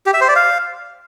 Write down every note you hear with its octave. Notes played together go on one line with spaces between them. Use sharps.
G4
E5
C5
D5
F5